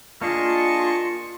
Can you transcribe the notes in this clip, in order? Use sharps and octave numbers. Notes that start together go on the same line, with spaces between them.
A#3 D4 F4 G#4 D#5 A5 C#6